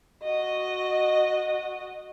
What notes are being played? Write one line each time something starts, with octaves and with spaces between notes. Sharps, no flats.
F#4 D#5